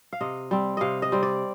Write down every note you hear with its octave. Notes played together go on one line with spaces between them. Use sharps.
F5
C3 D#5
G3 C4
C3 D#5 F5
D#5
G3 C4
D5